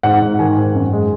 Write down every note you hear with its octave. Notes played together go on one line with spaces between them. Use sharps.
G#2 F#5
G#2
D#3 G#5
G#2
F#2
G#3